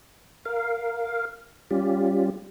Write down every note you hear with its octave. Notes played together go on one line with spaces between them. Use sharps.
A#4 F5
G3 C#4 F4 G4